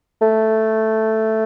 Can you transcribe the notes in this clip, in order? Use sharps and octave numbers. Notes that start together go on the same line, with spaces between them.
A3